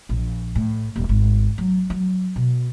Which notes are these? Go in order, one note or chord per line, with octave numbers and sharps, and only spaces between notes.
A#1
A2
D#1
G#1
F#3
F#3
B2